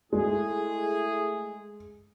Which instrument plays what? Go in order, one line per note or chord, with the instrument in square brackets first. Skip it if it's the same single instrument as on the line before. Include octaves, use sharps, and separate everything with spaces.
[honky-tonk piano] G#3 [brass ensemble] A3 E4 G#4